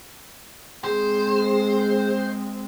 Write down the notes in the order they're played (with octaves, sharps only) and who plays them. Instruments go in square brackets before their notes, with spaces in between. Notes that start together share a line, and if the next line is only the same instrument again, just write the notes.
[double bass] G#3 C4 [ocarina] G#4 [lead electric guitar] C5